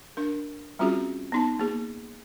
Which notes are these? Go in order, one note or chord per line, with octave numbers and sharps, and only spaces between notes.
D4 A#4
G3 C4 C#4 F4 F#4 G#4
B3 D#4 A5
A#3 G#4